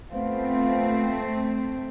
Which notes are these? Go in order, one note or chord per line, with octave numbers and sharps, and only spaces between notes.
F3 A3 B3 C4 F4